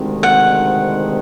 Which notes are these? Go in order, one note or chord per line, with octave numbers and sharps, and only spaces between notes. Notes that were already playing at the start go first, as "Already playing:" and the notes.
Already playing: D2 C3 D#3 G#3 C4
F#5